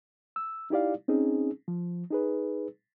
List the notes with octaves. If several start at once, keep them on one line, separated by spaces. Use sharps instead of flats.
E6
D#4 E4 G4 D5 F5
C4 C#4 D#4 G#4
F3
D#4 G#4 B4